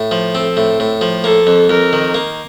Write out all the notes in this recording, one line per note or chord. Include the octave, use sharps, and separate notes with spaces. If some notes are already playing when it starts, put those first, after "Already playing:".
Already playing: A2
F3
C4 A4
A2
A2
F3
A#3 A4
F2
F2 A#4
D#3
A#3